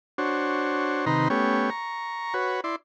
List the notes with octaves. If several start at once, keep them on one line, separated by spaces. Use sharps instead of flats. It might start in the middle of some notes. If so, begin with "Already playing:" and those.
D4 F#4 C5 C#5
C3 D#3 D#4 B4 A#5 C6
A3 B3 C#4 G4 C#5
A#5 C#6
F#4 B4 C#5
E4 D5 C6